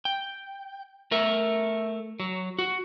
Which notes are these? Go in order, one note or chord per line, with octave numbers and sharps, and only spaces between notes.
G5
A3 A#4 E5
F#3
F#4